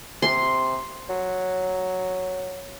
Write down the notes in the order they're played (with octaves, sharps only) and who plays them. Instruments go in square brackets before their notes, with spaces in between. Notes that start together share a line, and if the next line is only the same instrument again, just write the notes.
[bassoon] C3 [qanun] C6
[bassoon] F#3